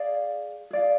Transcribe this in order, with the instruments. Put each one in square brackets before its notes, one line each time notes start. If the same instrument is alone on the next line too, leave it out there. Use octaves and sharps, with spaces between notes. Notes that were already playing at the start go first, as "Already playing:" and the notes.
Already playing: [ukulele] G#4 D5 F5
G#4 D5 F5